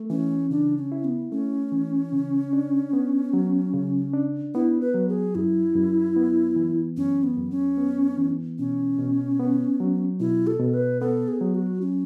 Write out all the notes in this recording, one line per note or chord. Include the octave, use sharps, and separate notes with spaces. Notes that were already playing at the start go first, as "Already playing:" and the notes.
Already playing: A3
E3 C#4
C#3 D4
C#4
E4
B3
A3 C#4
E3
C#3
D4
B3
F#3
C#3
D4
B3 E4
B4
F#3
G#4
F#2 E4
F#2
B3
E3
F#2 C#4
B3
F#2
C#4
B3
E3
B2 C#4
B2
B3
F#3
B2 E4
A4
B2
B4
B3 A4
G#4
F#3
F#4
C#4